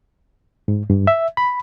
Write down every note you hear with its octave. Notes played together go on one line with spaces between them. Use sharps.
G#2
G2
E5
B5